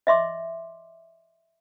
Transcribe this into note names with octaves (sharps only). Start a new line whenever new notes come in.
D#5 E5 C6 D6